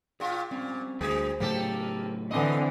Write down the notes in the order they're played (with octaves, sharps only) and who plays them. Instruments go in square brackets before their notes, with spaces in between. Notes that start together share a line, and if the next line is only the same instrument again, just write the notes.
[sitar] A#2 F4 [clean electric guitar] G#4 G5
[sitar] A#2 [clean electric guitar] G3 C4 C#4
[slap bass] D2 [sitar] G3 G#4 [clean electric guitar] B4 C5
[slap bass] A2 C#3 F#3 [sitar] A#3 G4 A4
[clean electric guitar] A#4 B4
[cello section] D3 E3 C4 [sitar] B3 D#5 [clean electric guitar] D5 F5 G#5